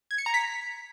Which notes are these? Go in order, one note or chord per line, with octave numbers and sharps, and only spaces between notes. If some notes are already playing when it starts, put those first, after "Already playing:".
G#6
C#7
A#5
B6